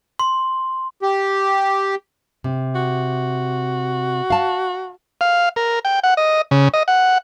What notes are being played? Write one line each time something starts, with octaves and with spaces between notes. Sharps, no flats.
C6
G4
C3
F#4
F5 A5
F5
A#4
G5
F#5
D#5
C#3
D#5
F#5